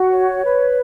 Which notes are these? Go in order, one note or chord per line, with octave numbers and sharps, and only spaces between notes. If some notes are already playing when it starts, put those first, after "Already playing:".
Already playing: F#4
C#5
B4